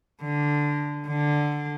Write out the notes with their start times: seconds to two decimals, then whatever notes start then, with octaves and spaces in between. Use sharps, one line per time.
0.22 D3
1.08 D3